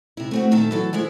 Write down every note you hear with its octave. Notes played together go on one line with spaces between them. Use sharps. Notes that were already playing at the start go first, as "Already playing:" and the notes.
C3 E4
A3 C4 F#4
A#2 D#3 A4 E5 A5
E3 F#3 A4
E3 F3 G#3 E4